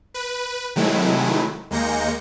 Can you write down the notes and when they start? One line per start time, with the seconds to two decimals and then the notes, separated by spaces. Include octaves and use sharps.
0.14 B4
0.76 C3 D#3 F#3 G#3 A3 E4
1.70 D#2 G#3 A#3 G6 A#6 C#7